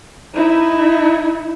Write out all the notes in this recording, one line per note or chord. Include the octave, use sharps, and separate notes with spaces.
D#4 E4